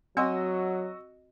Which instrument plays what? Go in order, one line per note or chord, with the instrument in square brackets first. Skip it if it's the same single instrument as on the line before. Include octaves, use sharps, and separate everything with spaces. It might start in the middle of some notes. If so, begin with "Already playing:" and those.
[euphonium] F#3 [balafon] C4 F#5 C6 [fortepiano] F#4 D#5 E6